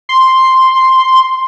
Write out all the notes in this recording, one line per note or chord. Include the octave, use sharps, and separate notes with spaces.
C6